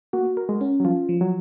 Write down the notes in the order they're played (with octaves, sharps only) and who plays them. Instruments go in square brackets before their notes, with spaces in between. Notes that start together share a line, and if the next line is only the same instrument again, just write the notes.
[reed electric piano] A#3 [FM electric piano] F#4
[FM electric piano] A#4
[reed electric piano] G#3
[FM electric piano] C#4
[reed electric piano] F#3
[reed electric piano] F3 [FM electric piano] F4
[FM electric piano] F3
[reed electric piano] F#3